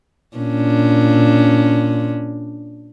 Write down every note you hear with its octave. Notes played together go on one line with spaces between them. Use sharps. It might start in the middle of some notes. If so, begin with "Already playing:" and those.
A#2 C#4 D4